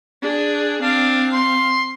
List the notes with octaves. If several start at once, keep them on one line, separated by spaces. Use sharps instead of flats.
D4 G#4
C4 D4 F5
C6